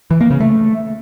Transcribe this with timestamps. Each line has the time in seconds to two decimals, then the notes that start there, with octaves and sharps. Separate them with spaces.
0.11 E3
0.21 A#3
0.31 C#3
0.40 A3